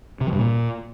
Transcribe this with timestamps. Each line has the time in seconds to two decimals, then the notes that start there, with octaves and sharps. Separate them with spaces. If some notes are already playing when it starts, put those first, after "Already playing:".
0.21 C3
0.27 F3
0.33 G2
0.39 A#2